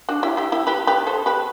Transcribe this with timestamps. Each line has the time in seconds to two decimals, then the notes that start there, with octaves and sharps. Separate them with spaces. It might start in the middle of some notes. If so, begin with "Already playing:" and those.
0.09 D4 F#4
0.23 E4 G4
0.37 E4 G4
0.52 E4 G4
0.67 G4 B4
0.87 G4 B4
1.07 A4 C5
1.26 G4 B4